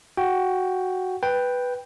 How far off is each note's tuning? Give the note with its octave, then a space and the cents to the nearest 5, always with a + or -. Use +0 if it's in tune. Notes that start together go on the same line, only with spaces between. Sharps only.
F#4 +0 G5 +0
B4 +0 G5 +5